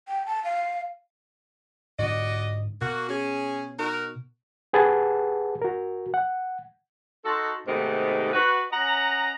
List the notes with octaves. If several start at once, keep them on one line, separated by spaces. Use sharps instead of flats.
G5
A5
F5
G#2 D3 D4 F#4 D5 D#5
B2 A#3 F#4
C#4 G#4
D#4 F#4 A#4
G4 G#4 B4 F#5 A5
F#4 A#4
F#5
D#4 F#4 A4 A5 C6
G#2 C3 D#3 A3 B3
F#4 B4
C#4 D#5 F#5 A#5